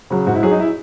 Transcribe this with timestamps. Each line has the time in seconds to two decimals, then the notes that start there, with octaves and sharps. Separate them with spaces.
0.10 C#3 F#3
0.27 G#2 F#4
0.35 E4
0.43 F#3 G#4
0.51 D#4
0.60 E4